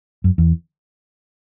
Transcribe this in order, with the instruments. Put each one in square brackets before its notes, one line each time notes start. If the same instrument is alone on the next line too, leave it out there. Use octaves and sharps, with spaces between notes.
[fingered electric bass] F#2
E2